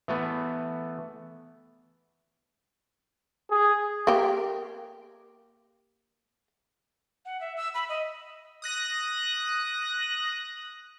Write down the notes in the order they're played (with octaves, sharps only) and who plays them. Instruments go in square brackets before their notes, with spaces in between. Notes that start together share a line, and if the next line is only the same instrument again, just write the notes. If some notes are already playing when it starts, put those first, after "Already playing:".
[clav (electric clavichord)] E3 A3 B3
[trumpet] G#4
[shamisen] A#3 G4
[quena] F#5
E5
E6
B5
D#5
[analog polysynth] D#6 F#6 A#6